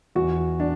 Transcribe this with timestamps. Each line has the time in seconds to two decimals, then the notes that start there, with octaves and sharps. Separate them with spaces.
0.15 E2 F#4
0.60 D4